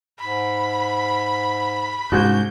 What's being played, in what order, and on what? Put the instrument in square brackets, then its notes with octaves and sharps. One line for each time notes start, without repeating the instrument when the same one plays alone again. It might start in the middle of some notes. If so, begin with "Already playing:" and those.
[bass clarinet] G#2 [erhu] B5
[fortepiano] C2 F#4 [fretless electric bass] G#2 [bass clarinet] C#4 [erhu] G6